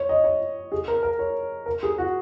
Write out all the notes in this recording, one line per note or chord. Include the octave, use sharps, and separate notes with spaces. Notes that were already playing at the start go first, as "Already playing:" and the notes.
Already playing: C#5
D#5
C#5
G#4
A#4
A#4
C#5
A#4
G#4
F#4